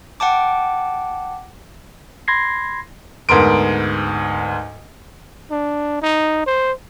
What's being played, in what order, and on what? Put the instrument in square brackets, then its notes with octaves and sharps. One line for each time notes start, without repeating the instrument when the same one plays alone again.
[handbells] F#5 G5 A5 D6
[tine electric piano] B5 C6 G#6 A#6 C7
[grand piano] D2 G#2 B3 A#4 C6 D7
[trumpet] D4
D#4
C5